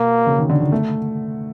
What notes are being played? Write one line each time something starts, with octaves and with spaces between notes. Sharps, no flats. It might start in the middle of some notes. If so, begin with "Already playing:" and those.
Already playing: B2 A#3
C#3
D#3
D3
D#3
A3